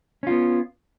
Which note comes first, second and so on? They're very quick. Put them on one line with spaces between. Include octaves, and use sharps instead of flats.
C#4 F4 B3